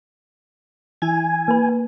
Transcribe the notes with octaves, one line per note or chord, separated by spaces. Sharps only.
E3 E4 G#5 G#6
A#3 B4